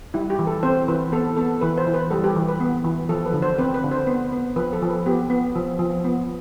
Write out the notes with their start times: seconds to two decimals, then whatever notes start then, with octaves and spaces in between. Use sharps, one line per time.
0.14 G3 E4
0.30 G4
0.39 E3
0.47 A4
0.63 C4 C5
0.88 E3 B4
1.12 B3 A4
1.37 B3 A4
1.61 E3 B4
1.78 C5
1.87 E3
1.94 B4
2.10 G3 A4
2.24 G4
2.36 E3
2.48 B4
2.60 B3
2.84 E3
3.09 F3 A4
3.26 B4
3.33 D3
3.42 C5
3.58 C4 B4
3.74 B4
3.83 D3
3.91 C5
4.07 B3
4.32 B3
4.56 F3 B4
4.73 A4
4.82 F3
4.89 B4
5.06 B3 G4
5.30 B3
5.55 F3
5.79 F3
6.04 B3